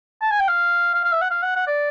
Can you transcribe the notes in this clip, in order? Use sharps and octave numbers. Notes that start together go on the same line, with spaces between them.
A5
G#5
G5
F5
F5
F5
E5
F#5
F5
F#5
F#5
D5